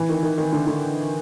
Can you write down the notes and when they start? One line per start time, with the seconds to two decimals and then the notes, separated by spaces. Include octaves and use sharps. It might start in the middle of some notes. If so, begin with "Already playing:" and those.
Already playing: E3
0.09 D#3
0.23 D#3
0.38 D#3
0.53 D3
0.67 D3